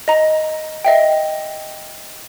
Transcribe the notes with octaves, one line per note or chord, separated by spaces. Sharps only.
D#5 A#5
D#5 E5 G5